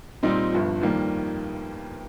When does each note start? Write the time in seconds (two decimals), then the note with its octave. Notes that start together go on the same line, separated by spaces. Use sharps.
0.23 A#2 G3 C4 D#4
0.53 G1 G2 F3
0.81 F2 D#3 G3 A#3